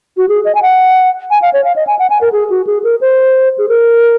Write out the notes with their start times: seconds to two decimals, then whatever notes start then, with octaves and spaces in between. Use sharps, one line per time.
0.17 F#4
0.29 G#4
0.45 D#5
0.55 G#5
0.62 F#5
1.30 G#5
1.42 F5
1.53 C#5
1.64 F5
1.76 D#5
1.87 G#5
1.99 F#5
2.10 G#5
2.21 A#4
2.32 G#4
2.50 F#4
2.67 G#4
2.84 A#4
3.01 C5
3.58 G#4
3.69 A#4